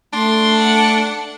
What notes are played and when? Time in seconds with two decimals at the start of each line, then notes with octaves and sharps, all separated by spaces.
0.13 A3 D4 C6
0.59 F#5